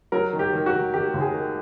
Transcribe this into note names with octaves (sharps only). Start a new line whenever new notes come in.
F#3 A#4
D#3
G4
D#3
F#4
D#3
D#3 G4
D#2
G#4
D#3